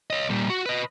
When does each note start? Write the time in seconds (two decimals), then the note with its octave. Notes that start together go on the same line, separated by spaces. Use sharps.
0.10 C#5 D#5
0.30 A#2 G3
0.50 F#4
0.66 B4 D#5